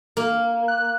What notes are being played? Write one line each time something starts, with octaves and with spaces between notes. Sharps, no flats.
A#3
F#6